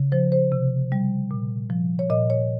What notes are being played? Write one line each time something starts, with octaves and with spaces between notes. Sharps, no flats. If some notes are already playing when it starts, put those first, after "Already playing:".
Already playing: C#3
F3 C5
C5
C3
G3
A#2
F3
C#5
A#2 D#5
C#5